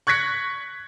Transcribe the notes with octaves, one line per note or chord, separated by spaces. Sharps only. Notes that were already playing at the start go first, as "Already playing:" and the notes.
C#6 F#6 G#6 A#6 B6 C#7